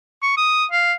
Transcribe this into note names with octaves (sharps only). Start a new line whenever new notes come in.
C#6
D#6
F5